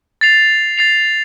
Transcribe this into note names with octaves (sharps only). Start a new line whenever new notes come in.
A6 C7 F7
A6 C7 F7